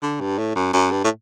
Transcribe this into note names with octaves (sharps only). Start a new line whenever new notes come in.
D3
G2
A2
F#2
F#2
G2
A2